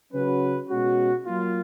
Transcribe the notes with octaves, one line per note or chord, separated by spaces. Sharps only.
C#3 F#3 C#4 F#4 B4
B2 G#3 C#4 F#4
F#3 A#3 F4